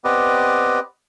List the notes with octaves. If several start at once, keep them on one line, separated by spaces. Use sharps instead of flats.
B3 C4 G4 B4 D5 D#5